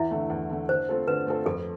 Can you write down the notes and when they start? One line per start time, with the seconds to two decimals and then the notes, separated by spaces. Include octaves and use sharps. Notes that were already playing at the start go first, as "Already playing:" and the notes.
Already playing: E2 E4 E5
0.11 D3 A3
0.30 E2
0.49 D3 A3
0.69 D3 C5
0.89 A3 C4 F4 A4
1.07 D3 B4
1.27 A3 C4 F4 A4
1.46 F2 A4